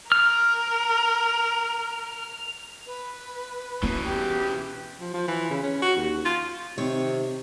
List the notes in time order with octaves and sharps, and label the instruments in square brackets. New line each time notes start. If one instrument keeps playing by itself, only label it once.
[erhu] A#4 [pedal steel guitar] F6
[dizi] B4
[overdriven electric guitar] B2 E3 [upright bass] B3 C#4
[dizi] G4
[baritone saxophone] F3
F3
E3
C#3
C#4
F#4
D#2
F4
[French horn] C3 [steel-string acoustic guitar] D#3 C4 C#5